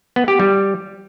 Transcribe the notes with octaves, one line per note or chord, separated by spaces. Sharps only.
B3
G4
G3